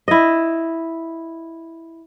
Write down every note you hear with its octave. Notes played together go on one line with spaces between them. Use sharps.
E4 D#5